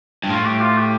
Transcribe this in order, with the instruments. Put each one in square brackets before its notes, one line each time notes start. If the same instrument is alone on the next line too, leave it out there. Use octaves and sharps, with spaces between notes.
[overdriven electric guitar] G2
[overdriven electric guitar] A2 [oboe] F4
[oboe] G4
F4
G4